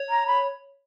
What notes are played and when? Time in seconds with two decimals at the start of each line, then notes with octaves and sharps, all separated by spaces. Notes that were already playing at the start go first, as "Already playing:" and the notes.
Already playing: C#5
0.10 A#5
0.27 B5